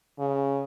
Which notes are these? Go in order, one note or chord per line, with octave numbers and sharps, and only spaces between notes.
C#3